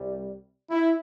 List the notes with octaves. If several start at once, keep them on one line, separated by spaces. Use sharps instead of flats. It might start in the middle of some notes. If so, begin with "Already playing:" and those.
Already playing: C2 C3 G3
E4